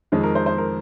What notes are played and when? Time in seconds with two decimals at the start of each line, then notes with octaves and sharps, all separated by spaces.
0.12 F2 D#3 G#3
0.23 A#4
0.35 C5
0.46 C5
0.58 A#4